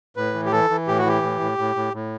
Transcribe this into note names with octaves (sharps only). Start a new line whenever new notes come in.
A2 B4
E3
G4
E3 A4
E3
A2 G4
F#4
E3 G4
A2
A2
A2
A2
A2